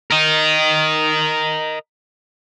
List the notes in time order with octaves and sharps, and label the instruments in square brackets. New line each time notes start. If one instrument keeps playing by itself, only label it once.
[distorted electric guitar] A#4 D#5